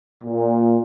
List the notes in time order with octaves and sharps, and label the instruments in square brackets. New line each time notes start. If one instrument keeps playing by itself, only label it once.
[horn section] A#2